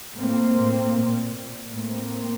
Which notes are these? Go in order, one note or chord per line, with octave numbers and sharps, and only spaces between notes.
A2 A#3 C4
A2
A#2
A#2
A2 A#3 C4